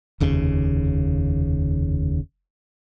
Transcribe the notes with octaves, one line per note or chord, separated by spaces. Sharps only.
F1 D#2 C#3